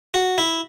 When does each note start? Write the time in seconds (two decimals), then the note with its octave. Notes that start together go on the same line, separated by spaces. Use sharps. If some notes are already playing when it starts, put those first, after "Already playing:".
0.14 F#4
0.38 E4